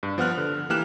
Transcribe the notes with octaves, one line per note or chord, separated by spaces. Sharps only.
G2
F3 B3 F#5 F6 F#6
D3
E3 A#3 G4 F6 F#6 E7